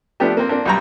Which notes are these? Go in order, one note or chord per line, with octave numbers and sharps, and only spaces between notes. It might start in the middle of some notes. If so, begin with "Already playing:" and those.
F3 A3 B3 D4 G4
A#3 C4
A#3 C4 D4
B1 G3 A#5